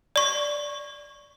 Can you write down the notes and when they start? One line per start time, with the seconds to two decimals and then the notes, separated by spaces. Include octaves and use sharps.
0.16 D5 C#6